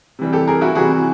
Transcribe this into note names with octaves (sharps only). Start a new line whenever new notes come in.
C3 E3 G3
G4 A4
G#4 A#4
E4 F#4
C3 E3 G3 F#4 G#4